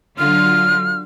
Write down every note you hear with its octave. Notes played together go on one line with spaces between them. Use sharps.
D3 F#3 F4 F6